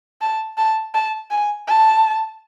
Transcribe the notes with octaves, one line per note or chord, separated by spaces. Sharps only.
A5
A5
A5
G#5
A5